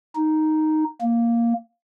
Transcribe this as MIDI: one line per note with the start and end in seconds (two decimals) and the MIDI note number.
0.16 0.84 63
1.02 1.54 58